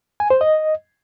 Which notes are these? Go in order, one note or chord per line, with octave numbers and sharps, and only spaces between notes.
G#5
C5
D#5